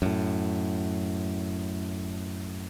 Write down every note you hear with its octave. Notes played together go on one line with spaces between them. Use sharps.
F#2 A2